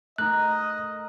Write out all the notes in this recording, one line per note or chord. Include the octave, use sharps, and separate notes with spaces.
A3 D#4 A#4 D#5 A#5 F#6